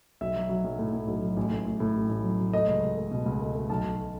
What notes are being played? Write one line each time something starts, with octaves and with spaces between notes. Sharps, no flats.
B1 E5
F#3
F#3
B1
A2
A2
B1
F#3
A1
A2
A2
A2
A1
A1
F#3
F#3
A3 D#5
C#2
C#2
A3
B2
C#2
A3
A3
B1 A5
B1